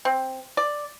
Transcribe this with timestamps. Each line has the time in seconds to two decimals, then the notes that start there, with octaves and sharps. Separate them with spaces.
0.05 C4
0.57 D5